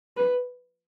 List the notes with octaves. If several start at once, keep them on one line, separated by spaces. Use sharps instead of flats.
B4